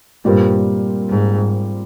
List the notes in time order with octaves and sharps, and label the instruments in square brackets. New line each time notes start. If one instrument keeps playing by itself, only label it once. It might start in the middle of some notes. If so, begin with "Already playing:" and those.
[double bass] G2 [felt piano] A#2 G3 C4 F4 A#4
[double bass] G#2